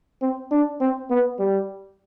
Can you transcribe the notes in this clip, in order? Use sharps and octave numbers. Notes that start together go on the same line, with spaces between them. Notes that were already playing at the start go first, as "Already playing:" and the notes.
C4
D4
C4
B3
G3